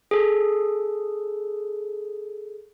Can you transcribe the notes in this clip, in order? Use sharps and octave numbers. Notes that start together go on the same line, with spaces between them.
G#4 A4